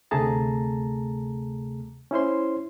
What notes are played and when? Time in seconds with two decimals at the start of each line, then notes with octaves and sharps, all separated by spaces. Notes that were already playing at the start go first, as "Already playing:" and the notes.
0.11 D2 C3 A3 G#4 A5 A#5
2.11 C#4 E4 C5 C6